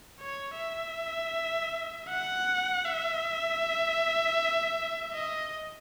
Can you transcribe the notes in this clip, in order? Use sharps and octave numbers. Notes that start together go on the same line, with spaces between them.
C#5
E5
F#5
E5
D#5